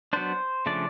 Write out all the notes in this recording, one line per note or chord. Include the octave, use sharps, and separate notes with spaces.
F#3 B3 D4 C5
C#3 F3 A3 D4 D5